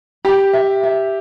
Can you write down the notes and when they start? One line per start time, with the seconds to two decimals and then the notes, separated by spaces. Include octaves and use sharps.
0.25 G4 B5
0.53 E5
0.83 E5